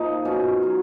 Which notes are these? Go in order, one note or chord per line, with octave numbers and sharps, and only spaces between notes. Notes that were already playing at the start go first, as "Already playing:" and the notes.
Already playing: A#2 F3 D#4
B2 C#4
F#3